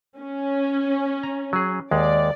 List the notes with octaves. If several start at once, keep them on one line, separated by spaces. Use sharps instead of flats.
C#4
A#5
F#3 G#4
D#2 G#3 D5